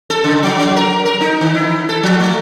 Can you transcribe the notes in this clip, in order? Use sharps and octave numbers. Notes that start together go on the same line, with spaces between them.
A4
C#3
F#3
F#3
A#4
A#4
D#4
D#3
E4
A4
F3
A3